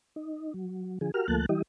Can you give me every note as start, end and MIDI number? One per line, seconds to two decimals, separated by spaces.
0.16 0.53 63
0.54 0.99 54
1.01 1.11 50
1.01 1.11 53
1.01 1.11 68
1.14 1.27 66
1.14 1.27 67
1.14 1.27 70
1.14 1.27 89
1.28 1.46 38
1.28 1.46 53
1.28 1.46 57
1.28 1.46 58
1.28 1.46 81
1.28 1.46 90
1.49 1.62 52
1.49 1.62 55
1.49 1.62 64
1.49 1.62 67
1.49 1.62 75